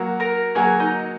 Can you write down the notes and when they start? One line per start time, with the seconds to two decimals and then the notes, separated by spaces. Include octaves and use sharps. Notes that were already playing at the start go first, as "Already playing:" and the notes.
Already playing: F#3 A#3 F#4
0.20 A#4 A#5
0.55 F#3 A#3 F#4 G#4 G#5
0.80 D#4 D#5